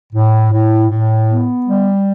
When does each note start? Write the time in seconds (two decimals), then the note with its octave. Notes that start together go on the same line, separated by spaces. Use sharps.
0.13 A2
0.51 A2
0.89 A2
1.28 B3
1.67 G3